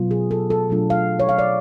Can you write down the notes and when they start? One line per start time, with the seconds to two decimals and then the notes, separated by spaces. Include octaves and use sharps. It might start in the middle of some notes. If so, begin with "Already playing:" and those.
Already playing: B2 F#3 B3 F4
0.11 G#4
0.31 A4
0.50 A4
0.69 B2 F#3 A3 D4 F4
0.90 F5
1.19 C#5
1.29 F5
1.39 D5